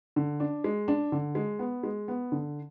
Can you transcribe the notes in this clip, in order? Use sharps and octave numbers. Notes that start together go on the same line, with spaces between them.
D3
D4
G#3
D4
D3
G#3
B3
G#3
B3
D3